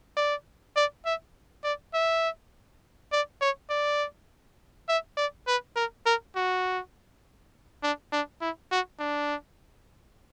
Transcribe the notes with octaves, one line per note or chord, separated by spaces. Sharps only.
D5
D5
E5
D5
E5
D5
C#5
D5
E5
D5
B4
A#4
A#4
F#4
D4
D4
E4
F#4
D4